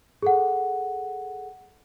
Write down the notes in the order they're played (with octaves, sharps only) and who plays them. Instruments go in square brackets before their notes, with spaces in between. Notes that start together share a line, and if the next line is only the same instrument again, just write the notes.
[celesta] G#4 A4 F#5